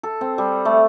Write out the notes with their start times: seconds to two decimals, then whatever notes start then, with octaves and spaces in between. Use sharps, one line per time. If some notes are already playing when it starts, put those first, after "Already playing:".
0.03 A4
0.21 C4
0.38 G3
0.65 A3